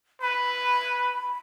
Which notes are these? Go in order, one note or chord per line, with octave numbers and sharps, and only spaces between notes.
B4 B5